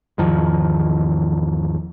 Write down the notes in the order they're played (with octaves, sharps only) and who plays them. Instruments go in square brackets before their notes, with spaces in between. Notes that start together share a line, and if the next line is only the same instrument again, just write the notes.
[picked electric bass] G#1 E2 D#3 F3